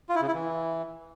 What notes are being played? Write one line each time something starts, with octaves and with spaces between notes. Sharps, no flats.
F4
E4
C#3
E4
E3